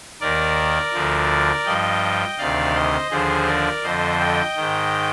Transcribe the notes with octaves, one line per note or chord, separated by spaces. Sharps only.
D#2 D#3 A#4 D5
D2 D3 F3
G2 F3 D#5 G5
D2 C3 D#3 D5 F5
C5 D#5
D#2 D3 F3 G#4 C5
A#4 D5
F2 D3 F3 C5 D#5
D#5 G5
G#2 D#3